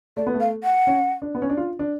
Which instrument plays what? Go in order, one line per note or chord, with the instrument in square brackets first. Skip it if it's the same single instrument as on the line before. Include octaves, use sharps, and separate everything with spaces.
[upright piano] A3 [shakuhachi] D5
[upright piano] B3
A3
[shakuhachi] F5
F#5
[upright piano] C#4
D4
B3
C#4
D4
F4
D4